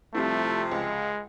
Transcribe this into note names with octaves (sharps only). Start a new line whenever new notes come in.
C3 F3 G3 A3 C4 E4
C#2 G#3